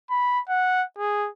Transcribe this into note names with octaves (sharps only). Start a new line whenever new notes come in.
B5
F#5
G#4